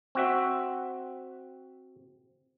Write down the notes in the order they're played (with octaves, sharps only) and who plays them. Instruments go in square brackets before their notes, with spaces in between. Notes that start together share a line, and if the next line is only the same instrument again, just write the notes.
[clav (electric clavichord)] C4 F#4 E5